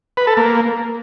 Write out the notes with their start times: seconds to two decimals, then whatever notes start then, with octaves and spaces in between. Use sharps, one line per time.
0.17 B4
0.27 A4
0.37 A#3